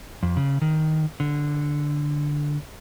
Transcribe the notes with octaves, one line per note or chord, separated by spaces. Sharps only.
F2
C#3
D#3
D3